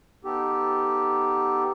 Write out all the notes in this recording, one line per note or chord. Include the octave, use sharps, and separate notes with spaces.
B3 D#4 G4 A4